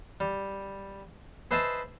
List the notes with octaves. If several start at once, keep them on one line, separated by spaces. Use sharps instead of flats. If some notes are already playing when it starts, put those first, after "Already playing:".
G3
G#4 B4 C5 D#5 E5 A5